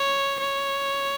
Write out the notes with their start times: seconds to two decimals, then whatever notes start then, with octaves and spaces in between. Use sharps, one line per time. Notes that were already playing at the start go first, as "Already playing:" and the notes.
Already playing: C#5
0.39 C#5